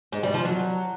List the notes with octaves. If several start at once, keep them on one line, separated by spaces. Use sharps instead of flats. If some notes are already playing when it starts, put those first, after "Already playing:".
G#2
G3
F3
F#3